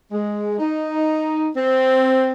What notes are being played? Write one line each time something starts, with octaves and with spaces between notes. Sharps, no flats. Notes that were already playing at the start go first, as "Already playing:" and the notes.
G#3
D#4
C4